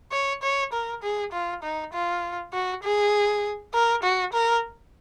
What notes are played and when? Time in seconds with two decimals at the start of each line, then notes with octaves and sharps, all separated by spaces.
0.12 C#5
0.42 C#5
0.73 A#4
1.03 G#4
1.32 F4
1.63 D#4
1.93 F4
2.53 F#4
2.83 G#4
3.74 A#4
4.03 F#4
4.33 A#4